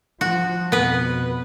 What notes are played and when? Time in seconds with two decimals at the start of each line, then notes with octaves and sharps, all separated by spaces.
0.21 F3 F#4
0.72 F2 B2 B3 B4